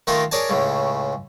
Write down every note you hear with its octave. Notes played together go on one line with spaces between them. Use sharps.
D#3 A3 D#4 F4 A#4
G#4 A#4 C#5 D5 G#5 A5
C#2 A2 C#3